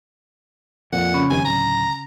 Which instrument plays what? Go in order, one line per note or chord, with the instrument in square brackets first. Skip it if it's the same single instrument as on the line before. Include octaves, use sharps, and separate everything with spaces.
[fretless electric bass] F2 A#2 [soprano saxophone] F#5
[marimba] C#3 C#4 B5
[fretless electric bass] F1 C3 D#3 [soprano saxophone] G#5
[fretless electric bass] D1 [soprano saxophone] A#5